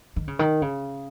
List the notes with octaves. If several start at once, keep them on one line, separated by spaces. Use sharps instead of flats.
D#3
C#3
D#3
C#3